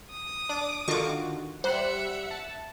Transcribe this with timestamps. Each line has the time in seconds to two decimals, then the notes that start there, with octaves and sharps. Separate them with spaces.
0.11 D#6
0.49 D4 D6
0.88 D3 D#3 F4 F#4 C#6 D6
1.64 G3 C5 E5 F#5 F#6
2.31 A5